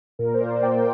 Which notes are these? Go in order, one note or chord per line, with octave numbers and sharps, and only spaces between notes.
A#2 A#4
C5
D5
A#2
G5